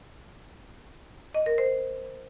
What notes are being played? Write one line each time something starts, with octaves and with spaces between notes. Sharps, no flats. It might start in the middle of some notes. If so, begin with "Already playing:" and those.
D#5
A#4
C5